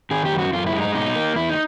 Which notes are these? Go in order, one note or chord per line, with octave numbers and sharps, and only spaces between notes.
D#3 G#4
G4
F#2
F#4
F#2 F4
E4
G#3
D#4
B2 D#4
A#3
E2 E4
D#4